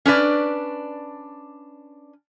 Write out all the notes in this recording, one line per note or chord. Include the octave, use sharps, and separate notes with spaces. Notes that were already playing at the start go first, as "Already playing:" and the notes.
C#4 D4 B4 D5